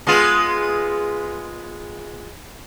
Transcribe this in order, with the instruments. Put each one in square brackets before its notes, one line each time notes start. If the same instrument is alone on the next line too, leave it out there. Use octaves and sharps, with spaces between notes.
[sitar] G#3 B3 F4